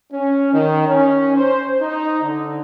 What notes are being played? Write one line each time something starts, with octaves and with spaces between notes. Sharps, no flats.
C#4
D#3
C#4
C5
D#4
D3